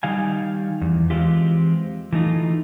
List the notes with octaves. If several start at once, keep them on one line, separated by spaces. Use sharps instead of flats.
D#3 G3 F5 G#5
E2
E3 F3 G#3 C4 F4 G4
E3 A3 D#4 F4